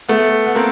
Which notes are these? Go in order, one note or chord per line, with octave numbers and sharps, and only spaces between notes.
A3 B3
B3
A#3 C4